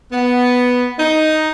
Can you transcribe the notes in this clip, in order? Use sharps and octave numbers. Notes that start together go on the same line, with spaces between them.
B3
D#4